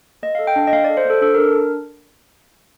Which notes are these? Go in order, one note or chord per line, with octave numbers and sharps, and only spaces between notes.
A#3 D#5
A4 F5
G5
D4
D#5
A#3 F5
A4 D5
C5
A#3 A4
D4 A4
D4 A#4